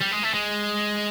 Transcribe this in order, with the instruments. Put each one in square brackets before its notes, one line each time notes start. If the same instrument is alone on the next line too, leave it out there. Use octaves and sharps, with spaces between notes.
[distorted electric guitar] G3
G#3
A3
G#3